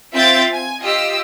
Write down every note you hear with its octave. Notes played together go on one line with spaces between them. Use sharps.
C4 F4 E5 G6 A6
G#5
F4 G4 D#5 E6